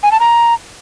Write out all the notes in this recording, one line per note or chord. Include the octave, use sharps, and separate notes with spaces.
G#5
A5
A#5